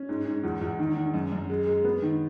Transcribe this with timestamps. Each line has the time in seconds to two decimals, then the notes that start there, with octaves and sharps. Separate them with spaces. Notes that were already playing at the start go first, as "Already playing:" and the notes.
Already playing: C#4
0.09 G#2
0.26 G#2
0.44 E2
0.61 E2
0.79 D#3
0.96 D#3
1.14 F#2
1.32 F#2
1.49 G#3
1.67 G#3
1.84 B3
2.02 D#3